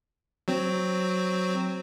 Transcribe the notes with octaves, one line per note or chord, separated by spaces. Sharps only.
F#3 C4